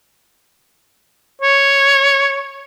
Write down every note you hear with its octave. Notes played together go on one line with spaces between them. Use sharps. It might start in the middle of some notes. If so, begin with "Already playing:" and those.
C#5